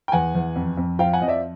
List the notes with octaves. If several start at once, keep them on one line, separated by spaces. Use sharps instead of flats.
G5
E2 F#5 G#5
E2
F2
F2
F3 F5 G5
F#5 G#5
F2 D#5
D5 E5